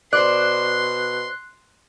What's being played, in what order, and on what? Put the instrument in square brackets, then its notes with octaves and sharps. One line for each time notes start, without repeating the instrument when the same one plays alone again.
[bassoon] B2 [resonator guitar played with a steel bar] C5 D5 [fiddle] C6 [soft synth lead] F#6